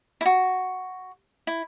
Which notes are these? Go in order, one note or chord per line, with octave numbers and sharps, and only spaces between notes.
E4
F#4
E4